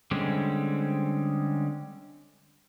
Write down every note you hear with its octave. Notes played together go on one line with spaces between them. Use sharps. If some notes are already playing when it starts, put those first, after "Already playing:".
D3 G3 G#3 C4 C#4